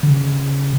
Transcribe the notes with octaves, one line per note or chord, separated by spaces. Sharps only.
D3
C#3